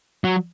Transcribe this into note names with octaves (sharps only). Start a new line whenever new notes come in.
F#3